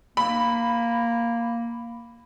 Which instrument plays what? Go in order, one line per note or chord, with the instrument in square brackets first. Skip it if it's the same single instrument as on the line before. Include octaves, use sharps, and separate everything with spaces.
[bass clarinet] A#3 [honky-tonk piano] B5